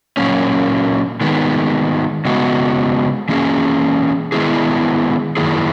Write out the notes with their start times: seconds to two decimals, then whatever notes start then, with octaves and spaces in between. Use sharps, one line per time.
0.17 A#2 F#3 A#3 C#4
1.21 D#3 G#3 B3
2.25 C#3 G#3 B3 F#4
3.29 E3 A#3 C#4 G#4
4.32 D#3 G#3 B3 E4 G#4
5.37 F#2 D#3 A#3 E4 G#4